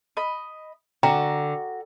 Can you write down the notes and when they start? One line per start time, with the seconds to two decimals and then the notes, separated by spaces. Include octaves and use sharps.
0.17 D#5 B5
1.03 D3 F#4 G5 A#5